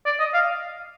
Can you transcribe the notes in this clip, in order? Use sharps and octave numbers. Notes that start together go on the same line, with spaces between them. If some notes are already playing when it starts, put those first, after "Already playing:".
D5
D#5
F5